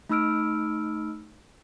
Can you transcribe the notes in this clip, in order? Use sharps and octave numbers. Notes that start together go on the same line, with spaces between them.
A3 D#4 B5 E6 F6 D7